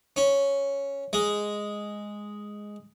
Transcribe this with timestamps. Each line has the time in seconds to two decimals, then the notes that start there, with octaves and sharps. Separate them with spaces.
0.16 C#4
1.13 G#3